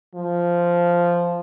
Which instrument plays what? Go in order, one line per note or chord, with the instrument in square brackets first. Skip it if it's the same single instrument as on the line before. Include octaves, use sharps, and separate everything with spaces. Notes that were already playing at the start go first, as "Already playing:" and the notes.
[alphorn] F3